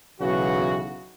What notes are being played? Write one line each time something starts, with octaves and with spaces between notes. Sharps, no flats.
B1 C#3 E3 F#4